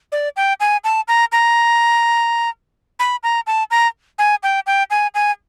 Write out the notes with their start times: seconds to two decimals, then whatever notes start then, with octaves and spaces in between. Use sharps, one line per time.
0.12 D5
0.37 G5
0.60 G#5
0.84 A5
1.08 A#5
1.32 A#5
2.99 B5
3.23 A#5
3.47 A5
3.71 A#5
4.19 G#5
4.43 G5
4.67 G5
4.90 G#5
5.15 G#5